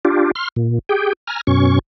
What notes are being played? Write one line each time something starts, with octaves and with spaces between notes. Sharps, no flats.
D4 F4 G4
C6 F6
A#2
G4 G#4 G5
G#5 A#5 F6
F#2 B2 C#4 C#6